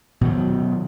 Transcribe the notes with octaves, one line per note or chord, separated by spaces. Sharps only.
B2 D#3 F#3